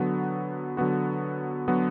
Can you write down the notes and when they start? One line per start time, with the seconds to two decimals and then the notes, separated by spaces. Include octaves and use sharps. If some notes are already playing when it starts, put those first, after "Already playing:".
Already playing: D3 F#3 B3 F#4
0.77 D3 F#3 B3 F#4
1.68 D3 F#3 B3 F#4